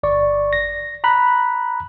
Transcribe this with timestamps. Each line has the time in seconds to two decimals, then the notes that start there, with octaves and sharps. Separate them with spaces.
0.03 G1 D5 C#6
0.53 A#6
1.04 A#5 B5 F#6